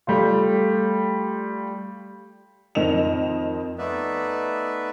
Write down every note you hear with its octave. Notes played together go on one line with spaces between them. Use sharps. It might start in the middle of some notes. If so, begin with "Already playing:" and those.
G3 A3 F4
F2 D#3 C4 D#5 E7 F7
A3 B3 D#4 B4 D5 E5